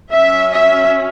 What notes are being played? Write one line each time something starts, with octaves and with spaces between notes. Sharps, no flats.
F#3 C#4 E5
E5